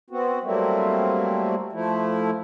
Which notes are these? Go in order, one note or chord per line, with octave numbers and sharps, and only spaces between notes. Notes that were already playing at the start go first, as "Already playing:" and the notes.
B3 C4 F#4
F#3 G3 A3 A#3 C4 E4
F3 A3 E4